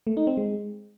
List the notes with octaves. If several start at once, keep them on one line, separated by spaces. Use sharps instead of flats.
A3
D#4
C4
G#3